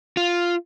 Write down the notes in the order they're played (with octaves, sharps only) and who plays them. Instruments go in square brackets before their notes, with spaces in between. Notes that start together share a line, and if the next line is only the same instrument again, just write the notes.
[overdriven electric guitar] F4